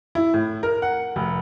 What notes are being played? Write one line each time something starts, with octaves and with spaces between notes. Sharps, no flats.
E4
A2
A#4
F#5
F1